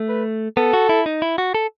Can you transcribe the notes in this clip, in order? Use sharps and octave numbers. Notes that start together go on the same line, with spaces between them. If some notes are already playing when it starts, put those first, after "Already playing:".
Already playing: A3
B4
B3 A4
F#4
E4
D#4
E4
F#4
A4